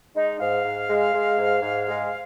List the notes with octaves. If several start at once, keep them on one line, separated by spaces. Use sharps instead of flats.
G#3 D#4
G#2 F5
G#2
G#3
G#3
G#2
G#2
G#3